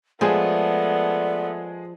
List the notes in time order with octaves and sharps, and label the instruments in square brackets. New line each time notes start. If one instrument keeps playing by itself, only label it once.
[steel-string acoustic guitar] F3 [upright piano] G#3 G#4 [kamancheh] A3 B3 [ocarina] D5